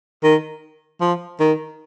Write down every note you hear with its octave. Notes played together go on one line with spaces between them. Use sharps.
D#3
F3
D#3